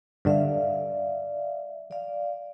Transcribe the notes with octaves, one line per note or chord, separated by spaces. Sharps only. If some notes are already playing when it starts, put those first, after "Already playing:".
G2 D3 D5 E5 F5
D5 F5